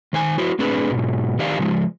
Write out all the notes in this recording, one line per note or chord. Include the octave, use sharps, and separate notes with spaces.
D#3 C5 G#5
E4 F#4 C5
A2 C4 D4 G#4 B4
G#2 B2
D#3 G4 A#4 C5 D5 F5
C#3 F3 G#3